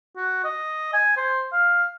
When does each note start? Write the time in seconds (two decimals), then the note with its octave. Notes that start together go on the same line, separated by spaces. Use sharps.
0.16 F#4
0.44 D#5
0.93 G#5
1.17 C5
1.52 F5